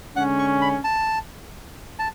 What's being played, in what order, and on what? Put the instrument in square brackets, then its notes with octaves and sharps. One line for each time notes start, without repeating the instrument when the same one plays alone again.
[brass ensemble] D3 G#3 C#4 [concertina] F#5
[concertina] C#6
B5
A5
A5